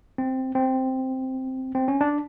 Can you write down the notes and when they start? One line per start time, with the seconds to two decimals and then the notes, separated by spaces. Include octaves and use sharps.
0.18 C4
0.55 C4
1.75 C4
1.88 C#4
2.01 D4